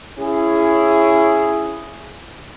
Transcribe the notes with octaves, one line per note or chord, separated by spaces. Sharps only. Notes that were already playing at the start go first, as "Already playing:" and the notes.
C#4 E4 G#4